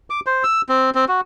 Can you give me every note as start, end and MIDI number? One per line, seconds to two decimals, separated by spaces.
0.10 0.20 86
0.26 0.44 72
0.44 0.62 88
0.69 0.90 60
0.95 1.05 60
1.08 1.21 66